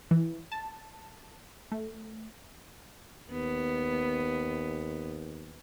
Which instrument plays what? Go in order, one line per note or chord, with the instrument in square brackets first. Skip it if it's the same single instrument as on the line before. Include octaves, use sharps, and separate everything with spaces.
[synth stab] E3
A5
A3
[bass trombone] D#2 [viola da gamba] B3